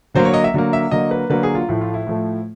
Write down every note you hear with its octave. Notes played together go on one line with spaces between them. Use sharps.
D3 F#3 A#3 C5
C#5
D#5
E5
D3 F#3 A#3
E5
D3 F#3 A#3 D#5
B4
D3 F#3 A#3 B4
G#4
F4
A2 F3 A3 E4
F4
E4
A2 F3 A3